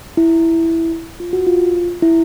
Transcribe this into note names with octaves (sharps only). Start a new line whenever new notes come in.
E4
F4
F#4
F4
E4